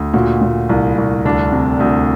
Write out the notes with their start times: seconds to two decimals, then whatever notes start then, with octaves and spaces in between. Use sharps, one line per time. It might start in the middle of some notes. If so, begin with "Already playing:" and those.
Already playing: D2
0.13 A#2 F#4
0.42 A#2
0.69 C2
0.98 C2
1.25 D2 D4
1.52 C3
1.80 D2